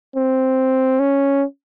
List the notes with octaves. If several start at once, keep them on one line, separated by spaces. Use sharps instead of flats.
C4
C#4